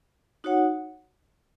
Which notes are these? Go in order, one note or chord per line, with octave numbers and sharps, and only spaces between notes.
D#4 F#4 C#5 F#5